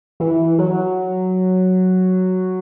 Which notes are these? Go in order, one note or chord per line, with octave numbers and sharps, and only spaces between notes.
E3
F#3